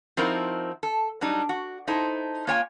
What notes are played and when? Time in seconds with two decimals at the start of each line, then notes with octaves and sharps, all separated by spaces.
0.17 F3 C4 D#4 E4 F#4 A#4
0.83 A4
1.21 F#3 G3 D4 D#4
1.49 F#4
1.88 D#4 E4 A4 C5
2.47 A#3 F4 C#5 G5 G#5